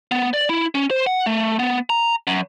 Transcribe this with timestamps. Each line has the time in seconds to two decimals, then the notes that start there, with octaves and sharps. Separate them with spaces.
0.12 B3
0.34 D5
0.49 E4
0.75 C#4
0.91 C5
1.07 F#5
1.26 A3
1.59 B3
1.90 A#5
2.27 F#2